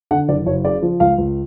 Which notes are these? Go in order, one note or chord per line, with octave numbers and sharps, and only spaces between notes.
D3 F#5
F#1 D5
F#1 C#5
C#3 D5
F3
C#2 F5
C#2